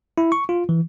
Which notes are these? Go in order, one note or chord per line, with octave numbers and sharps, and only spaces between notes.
E4
C#6
F4
E3